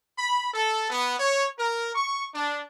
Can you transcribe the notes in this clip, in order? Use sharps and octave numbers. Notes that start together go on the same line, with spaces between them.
B5
A4
B3
C#5
A#4
C#6
D4